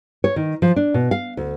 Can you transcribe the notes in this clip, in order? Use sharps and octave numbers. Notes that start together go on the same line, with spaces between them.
C#5
D#3
F3
D4
B2
F5
D2